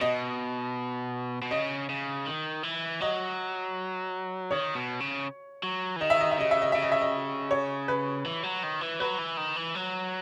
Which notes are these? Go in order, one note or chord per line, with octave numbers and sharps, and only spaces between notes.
B2 D#5
B2
C#3 D#5
C#3
D#3
E3
F#3 D#5
D#3 C#5
B2
C#3
F#3
E3
D#3 D#5
E5
D#5
E5
C#3 D#5
E5
D#5
C#3 E5
D#5
E5
D#5
C#5
B4
E3
F#3
D#3
E3
F#3 B4
E3
D#3
E3
F#3